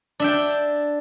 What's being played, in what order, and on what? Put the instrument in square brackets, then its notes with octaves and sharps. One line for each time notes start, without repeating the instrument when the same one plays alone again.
[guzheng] D4 E5 G5